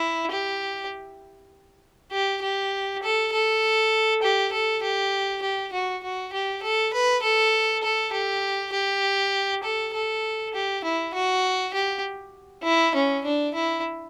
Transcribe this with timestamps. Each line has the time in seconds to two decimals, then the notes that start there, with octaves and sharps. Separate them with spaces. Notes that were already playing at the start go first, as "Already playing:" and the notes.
Already playing: E4
0.32 G4
2.12 G4
2.43 G4
3.03 A4
3.33 A4
4.23 G4
4.53 A4
4.83 G4
5.42 G4
5.73 F#4
6.04 F#4
6.33 G4
6.63 A4
6.94 B4
7.23 A4
7.84 A4
8.13 G4
8.73 G4
9.64 A4
9.94 A4
10.54 G4
10.85 E4
11.14 F#4
11.74 G4
12.64 E4
12.95 C#4
13.25 D4
13.55 E4